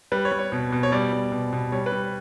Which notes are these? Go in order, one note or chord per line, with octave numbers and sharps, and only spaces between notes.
G3 B4
C#5
G3
C#5
B2
B2
C#5
G3 D5
G3
B2
B2
G3 C#5
B4
G3